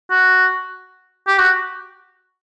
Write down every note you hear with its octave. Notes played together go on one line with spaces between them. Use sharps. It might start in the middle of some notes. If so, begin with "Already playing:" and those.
F#4
G4
F#4